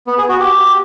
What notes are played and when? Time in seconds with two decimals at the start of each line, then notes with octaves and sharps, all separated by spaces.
0.07 B3
0.18 G#4
0.29 F#4
0.40 G4